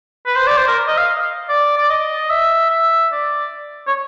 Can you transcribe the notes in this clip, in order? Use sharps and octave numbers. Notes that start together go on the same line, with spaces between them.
B4
C5
D5
C5
A#4
D#5
F5
D5
D5
D#5
E5
E5
D5
C#5